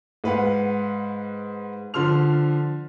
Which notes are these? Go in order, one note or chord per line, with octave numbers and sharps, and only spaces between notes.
G#2 B4 F5 F#5
D3 F3 C6 F6 F7